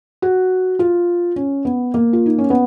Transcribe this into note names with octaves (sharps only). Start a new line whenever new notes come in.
F#4
F4
C#4
B3
A#3
F4
D#4
C#4
B3